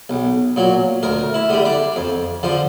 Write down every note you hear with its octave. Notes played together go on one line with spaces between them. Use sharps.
B1
A#2 F#3
D2 A#4
E4
D3 G3
D4
F2
D3 F3